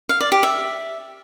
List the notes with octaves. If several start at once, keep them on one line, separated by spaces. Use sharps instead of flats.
F5
D5
G4
E5